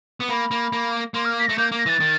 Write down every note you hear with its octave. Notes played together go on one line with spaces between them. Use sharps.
B3
A#3 B5
A#3
A#3
A#3 C6
F6
B6
A3 A#6
A#3 G6
A#3
A#6
E3 A6
D#3